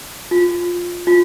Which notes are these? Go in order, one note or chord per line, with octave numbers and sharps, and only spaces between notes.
F4
F4